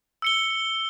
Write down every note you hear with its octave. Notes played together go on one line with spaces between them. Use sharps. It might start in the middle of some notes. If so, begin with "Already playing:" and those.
E6 C#7 G7